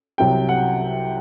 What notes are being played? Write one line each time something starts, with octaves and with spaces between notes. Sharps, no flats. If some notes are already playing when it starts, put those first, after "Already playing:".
C2 C3 F#3 G5
F#5